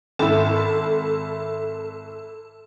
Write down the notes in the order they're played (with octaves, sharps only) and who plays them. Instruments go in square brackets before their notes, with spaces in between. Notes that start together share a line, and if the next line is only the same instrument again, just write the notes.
[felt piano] G#1 E4 [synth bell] A4